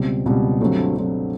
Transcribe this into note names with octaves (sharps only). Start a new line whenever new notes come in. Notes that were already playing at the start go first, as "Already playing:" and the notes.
Already playing: C#2 B2 G3 C4
C#2 B2 G3 C4
G2 D3 F#3 A3 C4
G2 D3 F#3 A3 C4